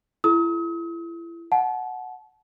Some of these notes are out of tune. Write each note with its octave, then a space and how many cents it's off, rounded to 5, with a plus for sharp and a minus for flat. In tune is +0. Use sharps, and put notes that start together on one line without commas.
E4 +35 A4 -45 D#6 +40
F#5 +0 A5 -35